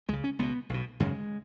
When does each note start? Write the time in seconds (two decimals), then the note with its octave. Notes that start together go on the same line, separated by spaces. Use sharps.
0.08 C#2 G#3
0.13 C#3
0.24 C#4
0.39 C#2 B2 B3
0.69 B1 B2
1.00 G#1 F#2 C#3 G#3